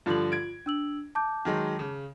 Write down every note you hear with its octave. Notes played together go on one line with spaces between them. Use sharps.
G2 D3 F3 F4 F#7
G#6 D7
D4 E6 F#7
A5 D6 G6
D#3 F#3 G#3
C#3